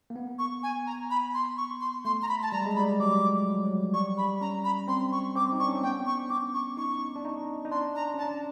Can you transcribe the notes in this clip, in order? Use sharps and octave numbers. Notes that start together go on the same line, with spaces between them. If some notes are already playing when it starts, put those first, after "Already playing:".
A#3
B3
C#6
G#5
A#5
B5
C6
C#6
C6
A3 C6
A#5
B5
A5
G3 A#5
G#3
A#5
B5
G3
F#3 D6
F#3
F3
F#3
G3 C#6
B5
C#4 A#5
B5
C4 C6
C#6
C4 D6
D#4
D4 C#6
C#4
C4
B3 G5
C#6
D4
C#4 D6
C#6
D#4 C#6
D4
D#4
D#4
D4 C6
A#5
C#4
D4 A5